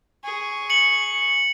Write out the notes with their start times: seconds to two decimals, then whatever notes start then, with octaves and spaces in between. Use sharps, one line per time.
0.24 G#4 C#6
0.70 C#7 F#7